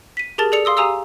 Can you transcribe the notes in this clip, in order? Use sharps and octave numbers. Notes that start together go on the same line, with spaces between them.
B6 D#7
G4 G#4 A#4 A5 A6
G#4 A4 D5 C#7 F7
F5 C6 D#6 E6
G4 F5 G#5 A#5 D#6 E6